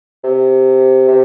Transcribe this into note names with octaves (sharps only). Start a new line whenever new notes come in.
C3
C3